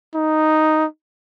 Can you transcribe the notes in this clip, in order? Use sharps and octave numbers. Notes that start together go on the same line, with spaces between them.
D#4